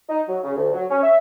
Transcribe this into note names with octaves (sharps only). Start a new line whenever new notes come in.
D#4
F#3
C#3
D2
F#3
C#4
E5